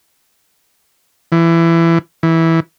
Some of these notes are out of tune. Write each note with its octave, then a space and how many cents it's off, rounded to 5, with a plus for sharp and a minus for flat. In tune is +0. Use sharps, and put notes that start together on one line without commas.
E3 +20
E3 -10